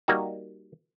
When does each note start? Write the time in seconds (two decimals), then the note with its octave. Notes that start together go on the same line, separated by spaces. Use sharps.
0.08 G3 A#3 D#4 F#4